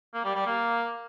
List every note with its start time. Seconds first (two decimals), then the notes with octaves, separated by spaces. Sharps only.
0.14 A#3
0.25 G3
0.35 G3
0.46 A#3